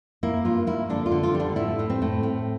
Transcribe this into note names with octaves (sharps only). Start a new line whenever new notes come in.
A#3 E4
G2 F4
A#3 E4
D3 D4
F4
D3
F4
G3
D4
A2 E4
A2
C4
A2
A2